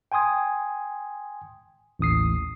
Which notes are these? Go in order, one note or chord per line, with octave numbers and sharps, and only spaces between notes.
G5 G#5 C6 D#6 G#6
A1 D#2 D#6 C7